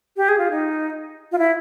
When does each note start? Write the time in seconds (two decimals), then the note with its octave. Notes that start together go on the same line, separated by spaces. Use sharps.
0.17 G4
0.29 G#4
0.39 F4
0.51 D#4
1.32 F4
1.38 E4